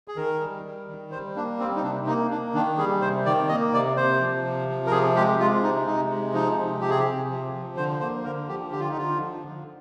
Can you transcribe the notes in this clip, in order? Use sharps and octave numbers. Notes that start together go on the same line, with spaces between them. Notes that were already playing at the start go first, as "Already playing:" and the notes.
G#4
D#3 A#4
G3
G3
D#3
G3 C5
A#3 D4
G3 C4
D#4
C3 D4
A#3 D#4
A#3 D4
D#3 D4
G3 G#4
C3 C5
D#3 D5
A#3 D#5
C3 D5
C3 C5
F3
C3
F3
A#4
C3 G#4
G#3 G4
G#3 F4
C3 D#4
C3 D#4
G#3
F3 D#4
C3
C3 G4
G#4
G4
C3
F3
F3
D3 C5
A#3 C5
D3 A#4
F3 G4
D3 G4
F4
D#4
D3 F4
F3
D3